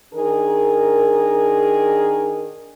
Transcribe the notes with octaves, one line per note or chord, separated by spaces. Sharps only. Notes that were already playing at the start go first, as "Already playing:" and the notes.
D#3 D4 G#4 A#4